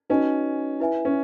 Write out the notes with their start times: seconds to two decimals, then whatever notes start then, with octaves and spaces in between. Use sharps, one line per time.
0.10 C#4 D#4 F#4 B4 D#5 G#5
0.80 E4 B4 E5 G#5
1.05 C#4